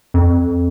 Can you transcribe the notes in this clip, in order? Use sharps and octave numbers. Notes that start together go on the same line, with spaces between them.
F2